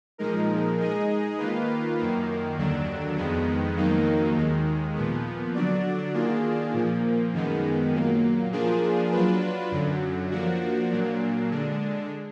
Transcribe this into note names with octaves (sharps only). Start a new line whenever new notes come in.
A#2 F3 G#3 D#4 A#4
G#3 D#4 G#4 D#5
D#3 A#3 F4 B4
F#2 D#3 A#3
D#2 D3 F#3 D4
F2 D#3 G#3 B3
F2 D#3 F#3 A#3 D#4
D#2 D#3 G#3
A#2 F3 B3
D3 F#3 D4 F#4 D5
D#3 A#3 D4 F4 G#4
A#2 F3 A#3
F#2 D#3 G#3 B3
A#2 F#3 A#3
F3 A#3 D4 F4 G#4
F#3 D4 F4 B4
F#2 D3 F#3
F3 A#3 D4 F#4
A#2 F#3 A#3 D4
D3 G#3 D4